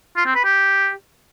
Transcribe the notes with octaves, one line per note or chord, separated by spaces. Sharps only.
F4
C4
B4
G4